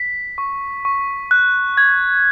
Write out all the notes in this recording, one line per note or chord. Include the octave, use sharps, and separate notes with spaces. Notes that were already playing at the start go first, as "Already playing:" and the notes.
Already playing: B6
C#6
C#6
F#6
G#6